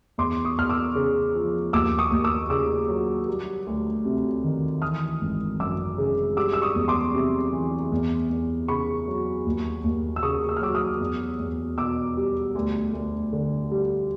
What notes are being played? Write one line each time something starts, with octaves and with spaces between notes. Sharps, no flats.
E2 C6 D6
C#6 D#6
E2 F6
D6 E6
C#3
F3
D#2 D6 E6
C#6 D#6
D#2
D6 E6
C#3 D6 E6
F#3
G3
D2
C3
D#3
E3 D#6 F6
G#1
F#2 D6 E6
C#3
G3 D6 E6
E6
C#6 D#6
E2
C6 D6
C3
E3
E2
E2
C#3 B5 C#6
F#3
D#2
D#2
E6
C#3 C#6 D#6
E6
F6
F#3 D6 E6
D#6 F6
E2
E2
B2 D6 E6
G3
D2
D2
D3
G3